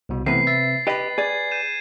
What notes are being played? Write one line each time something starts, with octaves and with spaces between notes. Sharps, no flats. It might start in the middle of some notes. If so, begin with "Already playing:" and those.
C2 B2
C3 E3 A3 B3 B4 C7
E5 A6
G4 B4 D#5 B5
G#4 D5 G#6
G6 D#7 E7